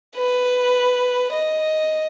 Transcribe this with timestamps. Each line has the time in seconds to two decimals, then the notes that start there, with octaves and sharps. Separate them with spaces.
0.16 B4
1.33 D#5